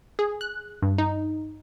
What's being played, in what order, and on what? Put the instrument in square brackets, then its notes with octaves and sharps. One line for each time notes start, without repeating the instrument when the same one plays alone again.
[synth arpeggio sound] G#4
F#6
G2
D#4